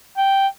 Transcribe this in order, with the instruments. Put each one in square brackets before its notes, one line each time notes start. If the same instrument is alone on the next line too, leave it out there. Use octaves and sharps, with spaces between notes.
[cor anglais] G5